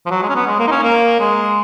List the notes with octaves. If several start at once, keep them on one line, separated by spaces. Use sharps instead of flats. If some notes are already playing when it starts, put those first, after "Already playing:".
F3
F#3
G#3
C#4
B3
G#3
A#3
D#4
C#4
A#3
G#3